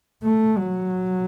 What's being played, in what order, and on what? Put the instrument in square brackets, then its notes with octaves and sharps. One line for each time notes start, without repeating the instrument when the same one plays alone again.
[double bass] A3
F#3